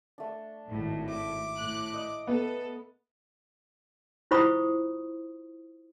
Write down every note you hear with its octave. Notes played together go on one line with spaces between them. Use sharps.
A3 D4
G#1 A2
E5 D6
A2 F#6
D#5
B3 A4
E4 F4 C5 B5 C#6 D#6